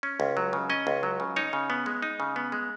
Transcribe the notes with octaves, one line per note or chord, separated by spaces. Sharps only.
C#4
C#2
F#3
C#3
C#4 D#5
C#2
F#3
C#3
D#4 C#5
C#3
B3
G#3
D#4
C#3
B3
G#3